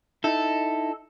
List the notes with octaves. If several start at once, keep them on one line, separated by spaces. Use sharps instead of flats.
D#4 E4 A4